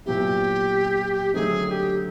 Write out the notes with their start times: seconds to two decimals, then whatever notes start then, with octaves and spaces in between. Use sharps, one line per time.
0.06 A#2 F#3 B3 E4 G4
1.34 D3 F#3 A3 C4 D#4 G#4
1.66 G#4
1.71 G4